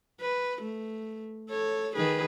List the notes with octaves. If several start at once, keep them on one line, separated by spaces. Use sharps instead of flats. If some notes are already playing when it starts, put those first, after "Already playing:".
B4
A3
A4 C#5
D#3 G#4 B4